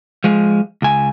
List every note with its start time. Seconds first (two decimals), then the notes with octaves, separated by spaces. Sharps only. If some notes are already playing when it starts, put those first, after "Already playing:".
0.24 F3 G#3
0.82 C#2 G#5